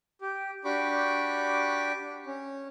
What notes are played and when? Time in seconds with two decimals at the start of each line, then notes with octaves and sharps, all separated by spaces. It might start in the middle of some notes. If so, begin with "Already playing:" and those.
0.21 G4
0.65 D4 F#4 G4 B5 C#6 D6
2.26 C#4